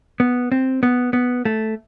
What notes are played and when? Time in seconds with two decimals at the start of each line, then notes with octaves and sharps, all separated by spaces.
0.20 B3
0.52 C4
0.83 B3
1.13 B3
1.45 A3